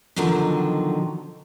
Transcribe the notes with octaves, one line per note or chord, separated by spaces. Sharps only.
B2 D3 D#3 F3 F#3